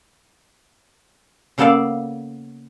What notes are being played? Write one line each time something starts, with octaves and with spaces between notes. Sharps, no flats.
C#3 A#3 B3 A4 D5 F5